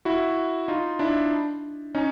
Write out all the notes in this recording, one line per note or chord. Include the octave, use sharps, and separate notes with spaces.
E4 F#4
D#4 F4
D4 E4
C#4 D#4